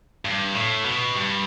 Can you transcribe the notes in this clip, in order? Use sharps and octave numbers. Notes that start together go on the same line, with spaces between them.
G2
A2
B2
G2